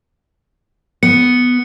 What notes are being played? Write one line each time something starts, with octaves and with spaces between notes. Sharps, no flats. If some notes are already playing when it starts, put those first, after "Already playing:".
B3 C#7